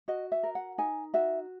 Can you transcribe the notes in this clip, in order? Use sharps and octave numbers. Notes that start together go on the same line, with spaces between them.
F#4 D#5
E5
A#4
F#5
D#4 G#5
F#4 E5